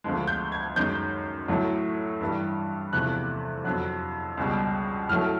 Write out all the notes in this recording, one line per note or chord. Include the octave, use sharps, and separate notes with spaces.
D2 D3 F3 G#3
G6
G#6
F#2 D#3 G#3 G6
A2 F#3 A3
G2 E3 G3
E2 C3 F3 A3 F#6
F2 D3 F#3 F#6
C#2 B2 G3
A2 F#3 A3 F6